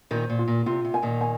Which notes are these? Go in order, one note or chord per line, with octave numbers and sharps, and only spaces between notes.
A#2 D#3 C5
A#2
F4
A#2
C3 F4
C3
G#5
A#2 D#3
G#5